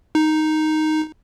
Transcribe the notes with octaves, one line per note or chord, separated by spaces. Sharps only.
D#4